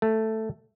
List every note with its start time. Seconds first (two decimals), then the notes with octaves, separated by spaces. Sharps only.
0.02 A3